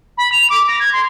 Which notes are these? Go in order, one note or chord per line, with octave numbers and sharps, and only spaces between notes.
B5
F7
D6
A#6
G#6
C6